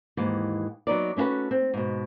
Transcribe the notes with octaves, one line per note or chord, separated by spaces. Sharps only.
D#2 G#2 E3
F#3 B3 D#4 D5
A3 C#4 D4 F#4 B4
C4
G#2 B2